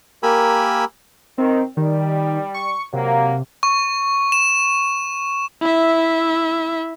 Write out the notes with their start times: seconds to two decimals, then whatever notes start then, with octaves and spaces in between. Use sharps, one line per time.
0.23 A#3 G4 A#4 G#5 B5 E6
1.38 D#3 C4
1.77 D#3 G3
2.54 C#6
2.93 C3 F#3 A#3
3.63 C#6
4.32 E7
5.62 E4 E5